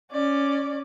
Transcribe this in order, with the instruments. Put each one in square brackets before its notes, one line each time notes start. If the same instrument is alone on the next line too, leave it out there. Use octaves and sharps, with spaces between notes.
[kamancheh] C#4 D5